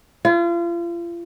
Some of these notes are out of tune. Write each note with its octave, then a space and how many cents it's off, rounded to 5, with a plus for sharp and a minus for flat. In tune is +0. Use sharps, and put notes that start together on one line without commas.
F4 -35